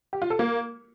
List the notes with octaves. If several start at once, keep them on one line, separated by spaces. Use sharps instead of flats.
G4
F4
A4
A#3